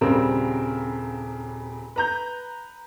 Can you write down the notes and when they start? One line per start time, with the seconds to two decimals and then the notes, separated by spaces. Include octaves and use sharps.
0.01 D#1 C#3 G3 C4 A#4
1.96 B4 A#5 G6